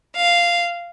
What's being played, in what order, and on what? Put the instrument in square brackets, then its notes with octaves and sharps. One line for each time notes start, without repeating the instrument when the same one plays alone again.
[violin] F5